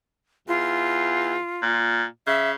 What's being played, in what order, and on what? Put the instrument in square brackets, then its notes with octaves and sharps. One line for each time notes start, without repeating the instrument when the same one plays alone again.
[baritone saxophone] E2 [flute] F4
[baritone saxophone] A#2
[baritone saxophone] C#3 [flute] E5